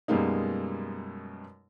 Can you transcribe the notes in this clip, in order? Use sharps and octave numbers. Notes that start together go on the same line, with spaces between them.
F#2 B2 G3 G#3 A#3 D#4